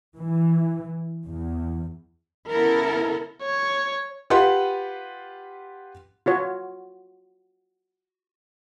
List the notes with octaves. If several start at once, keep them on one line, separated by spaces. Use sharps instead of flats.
E3
E2
C#3 B3 E4 A4 A#4
C#5
F4 G4 B4 F#5 C6
F4 F#4 C#5